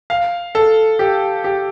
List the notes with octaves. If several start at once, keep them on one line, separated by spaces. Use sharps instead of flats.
F5
A4
G4
G4